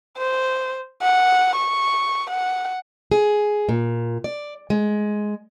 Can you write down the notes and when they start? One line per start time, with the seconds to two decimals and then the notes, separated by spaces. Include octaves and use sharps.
0.18 C5
1.02 F#5
1.57 C#6
2.30 F#5
3.12 G#4
3.69 A#2
4.24 D5
4.70 G#3